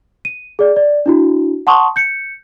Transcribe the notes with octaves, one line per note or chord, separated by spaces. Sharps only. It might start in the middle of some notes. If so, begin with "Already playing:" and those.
D#7
G#4 D5
D5
D4 E4 F#4
F#5 A5 C6 C#6 D#6
G6 C#7